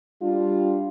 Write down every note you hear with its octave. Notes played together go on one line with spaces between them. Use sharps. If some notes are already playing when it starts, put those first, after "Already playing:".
G3 D4 F4